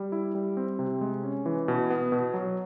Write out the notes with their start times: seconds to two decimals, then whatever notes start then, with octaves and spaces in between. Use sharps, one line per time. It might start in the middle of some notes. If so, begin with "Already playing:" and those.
Already playing: G3
0.12 E4
0.35 G3
0.57 C4
0.79 C3
1.01 G#3
1.23 C#4
1.46 E3
1.68 B2
1.90 B3
2.12 B2
2.34 F#3